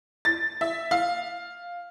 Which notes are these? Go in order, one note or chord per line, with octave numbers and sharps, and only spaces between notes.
A6
E5
F5